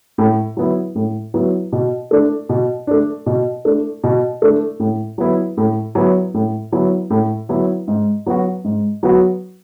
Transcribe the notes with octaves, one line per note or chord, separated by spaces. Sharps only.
A2
F#3 B3 E4
A2
F#3 B3 E4
B2
A3 D4
B2
A3 D4
B2
A3 D4
B2
A3 D4
A2
F#3 B3 E4
A2
F#3 B3 E4
A2
F#3 B3 E4
A2
F#3 B3 E4
G#2
F#3 B3 F#4
G#2
F#3 B3 F#4